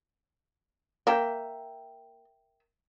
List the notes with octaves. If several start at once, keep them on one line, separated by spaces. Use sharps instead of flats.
A#3 A#4 E5 G5